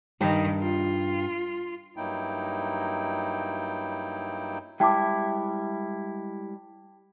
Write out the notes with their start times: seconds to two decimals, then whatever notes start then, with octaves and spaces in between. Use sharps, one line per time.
0.21 G2 D#3 D#4 G4
0.62 F4
1.97 G2 F#3 A#3 D#4 E4 G5
4.80 G3 G#3 E4 G5 A5 D6